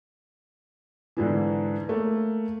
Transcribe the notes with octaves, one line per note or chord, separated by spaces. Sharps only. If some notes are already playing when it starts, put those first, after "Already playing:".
G#2 D3 E3
A3 A#3